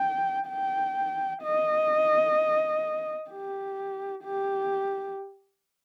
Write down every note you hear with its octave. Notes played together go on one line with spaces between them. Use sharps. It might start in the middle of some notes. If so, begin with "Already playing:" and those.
Already playing: G5
G5
D#5
G4
G4